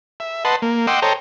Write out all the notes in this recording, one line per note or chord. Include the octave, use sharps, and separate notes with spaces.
E5
B4 D#5 F#5 A5 C6
A#3
D#5 F#5 G5 C6 D6 E6
A4 C5 C#5 D#5 G5 A#5